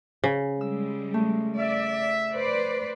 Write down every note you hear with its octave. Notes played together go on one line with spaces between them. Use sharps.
C#3
G3 G#3 E6
A3
D5 E5
B4 C5 D5